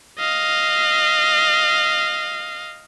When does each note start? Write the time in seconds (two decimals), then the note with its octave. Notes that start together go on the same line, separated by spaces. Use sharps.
0.19 D#5 F5